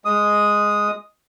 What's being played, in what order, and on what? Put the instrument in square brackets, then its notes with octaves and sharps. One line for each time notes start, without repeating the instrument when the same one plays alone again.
[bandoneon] G#3 D#6